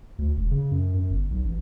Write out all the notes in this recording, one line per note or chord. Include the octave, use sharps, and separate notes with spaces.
D2
E1
C#3
F#2
F#2
G1
B1
A1